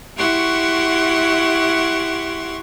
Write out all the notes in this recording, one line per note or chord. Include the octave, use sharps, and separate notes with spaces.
E4 F#4 G4 F#5 C6 C#6